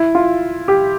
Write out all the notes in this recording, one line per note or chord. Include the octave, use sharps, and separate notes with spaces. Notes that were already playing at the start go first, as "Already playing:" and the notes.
Already playing: E4
F4
G4